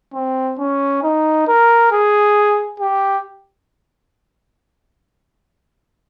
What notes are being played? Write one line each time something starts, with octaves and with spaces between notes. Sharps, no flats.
C4
C#4
D#4
A#4
G#4
G4